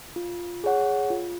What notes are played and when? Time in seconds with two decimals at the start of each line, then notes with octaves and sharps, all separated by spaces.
0.16 F4
0.64 G#4 C#5 F#5
1.10 F4